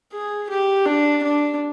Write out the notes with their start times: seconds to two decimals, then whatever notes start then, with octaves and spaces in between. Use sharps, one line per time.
0.13 G#4
0.50 G4
0.86 D4
1.23 D4